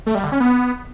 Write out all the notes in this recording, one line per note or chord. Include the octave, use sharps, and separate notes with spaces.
A3
G3
D3
C#4
B3